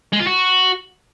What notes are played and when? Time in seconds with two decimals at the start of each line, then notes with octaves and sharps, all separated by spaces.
0.13 G#3
0.20 F4
0.27 F#4